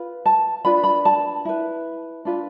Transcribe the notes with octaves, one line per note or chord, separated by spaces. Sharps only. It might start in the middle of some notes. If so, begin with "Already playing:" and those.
Already playing: F4 B4
A5
D4 F4 B4 B5
B5
A5
E4 B4
D4 F4 B4